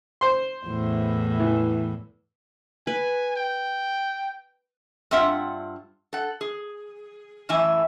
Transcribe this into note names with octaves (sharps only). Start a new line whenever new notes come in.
C5 C6
E2 A2
E3
B4 G#5
G5
G2 C4 F4 E5 F#5
A4 F#5
G#4
F#2 A2 E3 E5 G#5